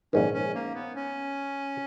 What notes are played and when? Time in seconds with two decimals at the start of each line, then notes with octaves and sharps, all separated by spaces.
0.13 A#1 G#2 D#3 C#4
0.34 C#4
0.55 A#3
0.74 B3
0.96 C#4